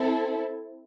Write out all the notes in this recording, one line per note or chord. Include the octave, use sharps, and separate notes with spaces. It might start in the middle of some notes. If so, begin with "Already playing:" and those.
Already playing: C4 E4 A4